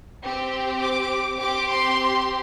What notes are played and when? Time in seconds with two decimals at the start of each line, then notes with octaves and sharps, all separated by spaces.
0.23 C4 G4
0.81 D6
1.39 C4 G4 D6
1.69 C6